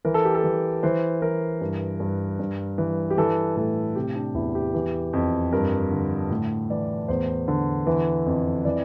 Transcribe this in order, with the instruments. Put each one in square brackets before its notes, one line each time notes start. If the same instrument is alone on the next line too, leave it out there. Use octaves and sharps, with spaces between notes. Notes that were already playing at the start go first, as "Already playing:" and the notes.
[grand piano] E3 A#4
A4
G4
A4
E3
E3 C5
E3 A#4
G2
G2
G2
E3
G4
E3 A4
A2 A4
C3 G4
D4
E2 E4
G4
E3
F2
G2 A#4
D3
A2
E3 D5
E2 C5
D3
E3
F2
E3 D5